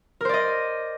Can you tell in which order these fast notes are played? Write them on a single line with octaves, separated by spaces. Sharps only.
A#4 C5 D5 D#5